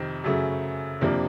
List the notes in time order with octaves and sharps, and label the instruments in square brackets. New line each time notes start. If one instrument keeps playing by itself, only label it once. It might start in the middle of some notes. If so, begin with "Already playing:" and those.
Already playing: [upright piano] F2 C3 D#3
F#2 C#3 F#3 A3
F2 C3 F3 A#3 D4